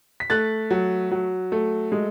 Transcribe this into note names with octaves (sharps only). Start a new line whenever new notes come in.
B6
A3 F#6 A6
F#3
F#3
A3
G#3